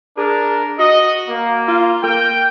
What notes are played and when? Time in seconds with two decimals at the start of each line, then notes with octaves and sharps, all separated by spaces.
0.17 D4 G#4 A#4
0.79 F#4 D#5
1.28 A#3
1.68 F4
2.03 A#3 G5